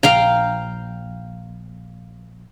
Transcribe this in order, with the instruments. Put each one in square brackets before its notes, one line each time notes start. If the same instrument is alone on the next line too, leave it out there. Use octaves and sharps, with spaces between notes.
[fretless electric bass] A#1 [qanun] F5 G5 A#5